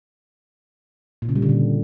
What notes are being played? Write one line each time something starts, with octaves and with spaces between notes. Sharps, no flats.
A#2
C#3
G3
D3
A#2